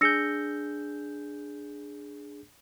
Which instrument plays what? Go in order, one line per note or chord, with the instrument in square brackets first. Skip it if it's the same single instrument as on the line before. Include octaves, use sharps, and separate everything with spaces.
[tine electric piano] D4 G#4 G6 [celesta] E6 A#6 C#7